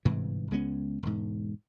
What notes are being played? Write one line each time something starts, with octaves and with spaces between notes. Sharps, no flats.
G1 G#2 C3 E3
C#2 G#3 B3 C#4
E1 G#2